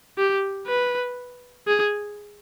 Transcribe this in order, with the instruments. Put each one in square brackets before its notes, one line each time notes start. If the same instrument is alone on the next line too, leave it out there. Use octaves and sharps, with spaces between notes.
[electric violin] G4
B4
G#4